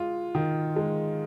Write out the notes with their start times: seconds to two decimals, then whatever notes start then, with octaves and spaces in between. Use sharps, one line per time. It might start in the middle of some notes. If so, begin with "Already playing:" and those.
Already playing: G#3 F4
0.35 D#3
0.76 G#3